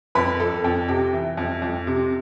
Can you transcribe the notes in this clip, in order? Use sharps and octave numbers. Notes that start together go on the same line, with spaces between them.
F2 B4 B5
F2 A4 A5
F2 G5
C3 G5
E3
F2
F2
C3